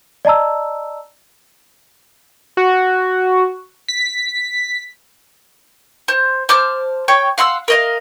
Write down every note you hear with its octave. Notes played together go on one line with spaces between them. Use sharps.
D5 D#5 A5 A#5 E6
F#4
B6
C5
C5 A5 D6 F6
C#5 G5
F5 F#5 C6 E6
A#4 D#5 F5